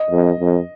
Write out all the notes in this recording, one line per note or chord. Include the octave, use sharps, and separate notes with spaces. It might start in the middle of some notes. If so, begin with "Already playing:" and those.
Already playing: D#5
F2
F2